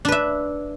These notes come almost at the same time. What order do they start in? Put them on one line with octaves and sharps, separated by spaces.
D4 B4 E5